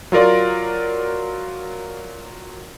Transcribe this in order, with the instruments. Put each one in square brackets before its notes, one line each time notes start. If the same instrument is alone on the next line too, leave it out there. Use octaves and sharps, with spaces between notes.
[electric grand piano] F#3 F4 A#4 D5